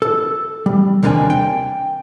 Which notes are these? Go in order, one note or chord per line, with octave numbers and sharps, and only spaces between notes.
A4
G3
D#2 C3 A#3 D4 G5 G#5
G5